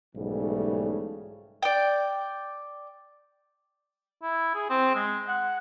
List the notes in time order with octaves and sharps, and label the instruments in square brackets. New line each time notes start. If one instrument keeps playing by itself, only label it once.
[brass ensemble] B1 G#2 C#3 E3 G3 A3
[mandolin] D5 G5
[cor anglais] E4
G#4
C4
G#3
F#5